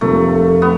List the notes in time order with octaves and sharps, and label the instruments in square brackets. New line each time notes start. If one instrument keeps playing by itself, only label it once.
[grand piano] F1 F2 C3 F3 A#3 [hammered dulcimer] A3
[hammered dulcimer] B3